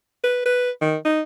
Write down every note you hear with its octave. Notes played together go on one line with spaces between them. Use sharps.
B4
B4
D#3
D#4